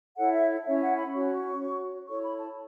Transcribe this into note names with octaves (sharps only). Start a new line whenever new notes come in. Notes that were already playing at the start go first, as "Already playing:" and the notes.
E4 A4 C#5 F#5
E5
C#4 E4 C#5 E5
F#5
B5
C#4 F#4 C#5 C#6
F#4 C#5
E4 A4 C#5 C#6
B5
A5